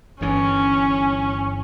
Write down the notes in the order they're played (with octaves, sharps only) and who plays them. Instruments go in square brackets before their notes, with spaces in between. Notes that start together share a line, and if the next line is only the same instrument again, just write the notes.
[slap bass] G1 G2 E3 [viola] C#4